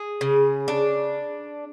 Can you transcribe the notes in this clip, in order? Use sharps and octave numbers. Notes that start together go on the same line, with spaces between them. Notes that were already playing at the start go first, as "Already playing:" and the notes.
Already playing: G#4
C#3
D4